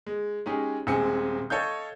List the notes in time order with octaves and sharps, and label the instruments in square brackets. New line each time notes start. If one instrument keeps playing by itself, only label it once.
[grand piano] G#3
G#3 C#4 D#4 G4 G#4
D#1 G#3 C4 G#5 C#7
A4 C#5 D#5 F5 G6